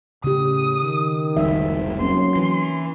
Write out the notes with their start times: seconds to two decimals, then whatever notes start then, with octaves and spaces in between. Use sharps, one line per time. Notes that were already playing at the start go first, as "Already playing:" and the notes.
0.24 A2 C#3 G4 D#6
0.82 D#3
1.37 F1 C2 G#2 F3 D#4 E5
2.00 F#3 A#3 C4 C#4 C6
2.36 E3